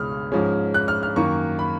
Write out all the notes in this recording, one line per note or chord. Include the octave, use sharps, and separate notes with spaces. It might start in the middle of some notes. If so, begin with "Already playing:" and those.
Already playing: C#2 B2 G#3 C#4 B5 D#6 F6
G#2 F3 G#3 C#4
F#6
F6
F6
F#2 D#3 A#3 C#6
B5